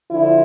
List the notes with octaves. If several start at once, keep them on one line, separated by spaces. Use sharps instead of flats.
D3 F3 E4